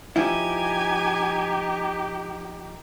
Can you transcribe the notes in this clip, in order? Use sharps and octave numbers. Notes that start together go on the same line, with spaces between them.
F3 D#4 E4 G4 G#5